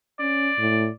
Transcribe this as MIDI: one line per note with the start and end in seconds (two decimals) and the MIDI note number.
0.20 0.52 61
0.20 0.92 74
0.58 0.88 45